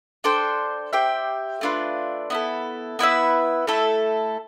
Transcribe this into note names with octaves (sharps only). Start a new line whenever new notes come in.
D4 A4 C5 G5
G4 C5 E5 G5
A3 D4 F4 B4
B3 E4 A4
B3 E4 B4 E5
A3 E4 A4 E5